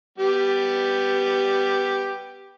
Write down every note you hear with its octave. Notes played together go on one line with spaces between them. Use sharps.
G3 B3 G4